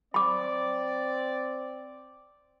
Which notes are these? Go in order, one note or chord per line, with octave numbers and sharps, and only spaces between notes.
C4 D5 B5 D6